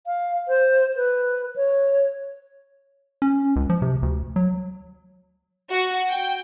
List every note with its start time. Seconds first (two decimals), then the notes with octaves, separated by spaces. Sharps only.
0.07 F5
0.48 C5
0.96 B4
1.56 C#5
3.22 C#4
3.56 C#2
3.70 F3
3.82 C3
4.03 D2
4.36 F#3
5.71 F#4
6.09 G5